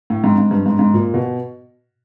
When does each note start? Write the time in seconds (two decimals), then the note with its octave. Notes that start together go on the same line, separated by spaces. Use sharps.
0.10 A2
0.24 G#2
0.38 G#2
0.51 G2
0.66 G#2
0.79 G#2
0.94 A#2
1.14 B2